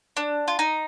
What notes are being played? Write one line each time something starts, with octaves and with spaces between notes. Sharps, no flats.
D4
F4
D#4